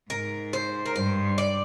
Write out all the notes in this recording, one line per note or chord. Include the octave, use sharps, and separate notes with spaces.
G#2 A#4
C5
A#4
G2 C5
D5